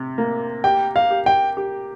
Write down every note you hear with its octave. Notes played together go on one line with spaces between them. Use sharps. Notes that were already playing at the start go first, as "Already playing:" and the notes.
Already playing: C3
A#3
G4 G5
F5
G4
G5
G4